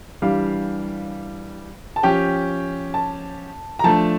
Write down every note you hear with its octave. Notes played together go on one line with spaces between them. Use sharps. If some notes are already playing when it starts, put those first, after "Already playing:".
E3 G3 D4 G4 F5
A5
F3 C#4 G4 G5
A5
A#5
F3 A3 D4 A5